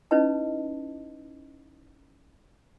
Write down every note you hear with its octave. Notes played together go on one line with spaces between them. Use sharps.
C#4 D#4 E4 B4 D#5 A5